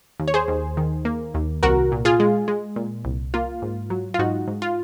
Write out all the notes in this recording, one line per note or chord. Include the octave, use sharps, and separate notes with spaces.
D#2
C#5
G#4 C5
D#2
D#3
A#3
D#2
C2 F#4 A#4
A#2
F4 G#4
G#3
G#3
A#2
C2
A#3 F4
G#2
F#3
F4
G#2 D#4 F#4
G#2
F4